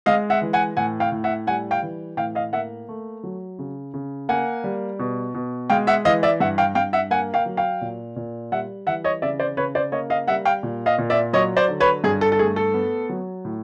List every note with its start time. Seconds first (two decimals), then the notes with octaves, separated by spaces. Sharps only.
0.06 G#3 D#5 F5
0.30 E5 F#5
0.42 E3
0.53 F#5 G#5
0.77 A2 F#5 G#5
1.00 F5 G5
1.12 A2
1.24 E5 F#5
1.47 G3 F#5 G#5
1.71 F5 G5
1.82 E3
2.17 A2 F5 G5
2.35 D#5 F5
2.53 A#3 E5 F#5
2.89 A3
3.24 F#3
3.59 C#3
3.94 C#3
4.29 A#3 F#5 G#5
4.64 G3
4.99 B2
5.34 B2
5.70 G#3 F5 G5
5.87 E5 F#5
6.05 E3 D#5 F5
6.23 D5 E5
6.40 G2 E5 F#5
6.58 F5 G5
6.75 G2 F5 G5
6.93 E5 F#5
7.11 A#3 F#5 G#5
7.34 F5 G5
7.46 F#3
7.57 F5 G5
7.81 A#2
8.16 A#2
8.52 G3 E5 F#5
8.87 E3 E5 F#5
9.04 C#5 D#5
9.22 C#3 D5 E5
9.39 C5 D5
9.57 C#3 B4 C#5
9.75 C5 D5
9.92 A#3 C#5 D#5
10.10 D#5 F5
10.28 G3 E5 F#5
10.45 F5 G5
10.63 A#2
10.86 D#5 F5
10.98 A#2
11.10 D5 E5
11.33 F#3 C#5 D#5
11.57 C5 D5
11.68 D3
11.80 B4 C#5
12.04 G2 G#4
12.21 A4
12.32 A4
12.39 A3 G#4
12.56 A4
12.74 B3
13.09 F#3
13.45 A2